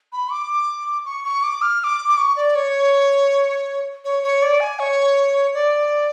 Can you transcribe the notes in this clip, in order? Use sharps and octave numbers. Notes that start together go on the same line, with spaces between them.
B5
D6
C#6
C#6
D6
F6
F6
D6
D6
C#6
D5
C#5
C#5
C#5
D5
G#5
C#5
D5